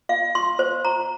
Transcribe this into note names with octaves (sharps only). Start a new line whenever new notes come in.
F5
C6
C5
A#5